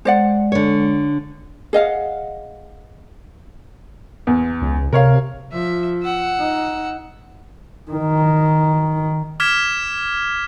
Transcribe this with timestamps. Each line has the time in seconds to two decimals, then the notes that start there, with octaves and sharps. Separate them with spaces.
0.05 G#3 C5 D5 F#5
0.52 D3 C#5
1.73 G#4 D#5 F5 F#5
4.27 E2
4.62 C#2
4.93 C3 A#4 C#5 F5
5.52 F3 E5
6.03 F#5 E6
6.39 D#4
7.91 D#3
9.40 D6 F6 G#6 B6 E7